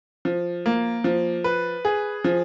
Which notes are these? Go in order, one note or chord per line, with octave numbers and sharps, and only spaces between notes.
F3
A#3
F3
B4
G#4
F3